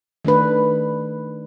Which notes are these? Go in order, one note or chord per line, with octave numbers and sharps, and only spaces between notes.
D#3 A3 D4 B4